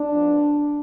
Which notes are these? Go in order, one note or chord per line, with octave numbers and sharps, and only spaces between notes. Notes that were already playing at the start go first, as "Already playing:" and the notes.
Already playing: D4
F2 F3 B3